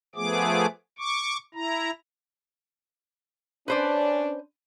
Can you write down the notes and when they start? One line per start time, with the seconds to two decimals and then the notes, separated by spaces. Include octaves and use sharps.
0.15 F3 A3 B3 G#4 D6
0.99 C#6 D6
1.54 E4 A#5
3.68 C#4 D4 B4 C5 D5